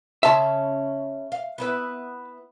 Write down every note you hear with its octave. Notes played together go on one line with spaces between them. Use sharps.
C#3 C#4 C5 E5 A5
F5
B3 E4 B4